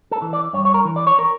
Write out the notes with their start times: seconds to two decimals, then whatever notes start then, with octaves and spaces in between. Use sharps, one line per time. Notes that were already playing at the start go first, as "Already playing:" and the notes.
0.11 A4
0.22 E3
0.33 D5
0.53 G2 C#5
0.65 C#5
0.74 A#4
0.85 E3
0.96 D5
1.07 C#5
1.19 A#4